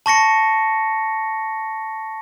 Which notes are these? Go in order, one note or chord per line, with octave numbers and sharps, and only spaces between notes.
A5 C#6 A#6 C#7